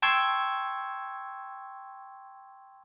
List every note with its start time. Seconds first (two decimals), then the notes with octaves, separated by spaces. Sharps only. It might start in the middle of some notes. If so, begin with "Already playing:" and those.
0.02 G5 A5 C6 C#6 E6 G#6